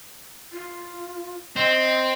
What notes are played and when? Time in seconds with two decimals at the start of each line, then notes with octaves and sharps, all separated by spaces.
0.52 F4
1.56 C4 D#5